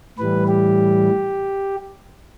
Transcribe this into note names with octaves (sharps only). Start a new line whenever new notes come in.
A2 E3 G3 B4
G4